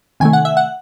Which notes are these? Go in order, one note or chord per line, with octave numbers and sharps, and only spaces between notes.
C3 D#3 A3 G#5
F#5
E5
F#5